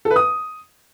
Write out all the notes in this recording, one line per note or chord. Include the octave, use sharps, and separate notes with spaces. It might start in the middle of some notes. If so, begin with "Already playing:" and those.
A4
B4
D#6